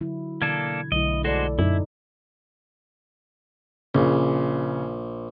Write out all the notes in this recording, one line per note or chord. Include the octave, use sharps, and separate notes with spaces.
D3 F#3 E4
B2 D3 E3 A#3 D4 A4 G#6
B1 D3 A3 E4 D#5
G#3 F#4 A4 C5 D5
F#2 A#2 D#4 E4
A#1 C#3